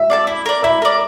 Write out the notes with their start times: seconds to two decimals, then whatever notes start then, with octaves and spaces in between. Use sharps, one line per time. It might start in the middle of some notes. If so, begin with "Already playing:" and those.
Already playing: E5
0.10 D5 F5 A5
0.27 E4
0.46 A#4 D5
0.63 E4 E5
0.82 A#4 D5